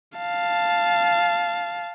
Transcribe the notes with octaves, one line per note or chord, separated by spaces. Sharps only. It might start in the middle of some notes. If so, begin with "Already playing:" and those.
F5 A5